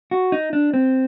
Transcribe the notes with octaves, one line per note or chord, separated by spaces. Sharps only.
F#4
D#4
D4
C4